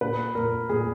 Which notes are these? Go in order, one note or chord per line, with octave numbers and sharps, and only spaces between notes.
A#2 B4
A#2 A#4
A#2 G#4